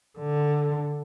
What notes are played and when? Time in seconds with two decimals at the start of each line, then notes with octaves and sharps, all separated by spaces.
0.18 D3